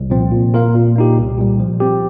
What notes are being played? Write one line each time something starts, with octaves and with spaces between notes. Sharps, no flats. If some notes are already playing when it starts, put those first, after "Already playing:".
Already playing: C2
A#2 F3 C4
A#2
A#3 F4 A#4 F5
A#2
A#3 D#4 G4
C2
A#2 G3
F3
C4 G4